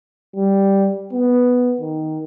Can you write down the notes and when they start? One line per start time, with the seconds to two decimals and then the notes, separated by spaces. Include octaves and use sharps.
0.34 G3
1.13 B3
1.81 D#3